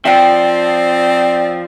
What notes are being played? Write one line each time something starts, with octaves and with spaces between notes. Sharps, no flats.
F3 C4 D5 E5 G5